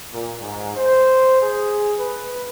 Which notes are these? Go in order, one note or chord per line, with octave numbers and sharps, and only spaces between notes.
A#2
G#2
C5
G#4
B4